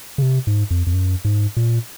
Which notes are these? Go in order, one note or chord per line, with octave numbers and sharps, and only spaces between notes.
C#3
C3
G#2
F2
F2
F#2
G#2
A#2